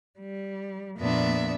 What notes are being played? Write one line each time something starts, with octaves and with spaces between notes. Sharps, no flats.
G3
F2 A#2 A#3 B3 D4 E5